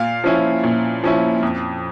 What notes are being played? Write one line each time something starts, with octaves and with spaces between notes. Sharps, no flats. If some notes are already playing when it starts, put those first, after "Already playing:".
Already playing: A#2 F5
F3 C#4 E4
A#2
F3 C#4 E4
F2